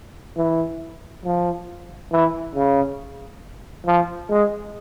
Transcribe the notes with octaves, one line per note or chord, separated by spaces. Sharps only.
E3
F3
E3
C#3
F3
G#3